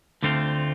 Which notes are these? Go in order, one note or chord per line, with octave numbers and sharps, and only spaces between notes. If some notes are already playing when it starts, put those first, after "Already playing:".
D2 D3 A3 C4 F4